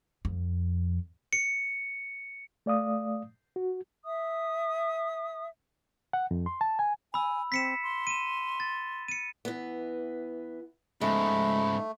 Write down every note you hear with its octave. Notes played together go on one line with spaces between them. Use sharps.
F2
C#7
A3 D5 F5 D#6
F#4
E5 D#6
F#5
F2
C6
A5
G#5
G#5 B5 E6
C4 B6 C#7 E7
C6
D#7 E7
A6
C#7 D#7
E3 B3
G#2 C#3 G#3 A3 B5